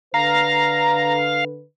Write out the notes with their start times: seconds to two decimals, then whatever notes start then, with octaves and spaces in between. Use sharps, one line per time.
0.14 D3 B4 F5 A#5